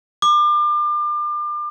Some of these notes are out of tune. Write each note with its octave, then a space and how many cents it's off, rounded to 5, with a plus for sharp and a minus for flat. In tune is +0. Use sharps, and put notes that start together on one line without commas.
D6 +35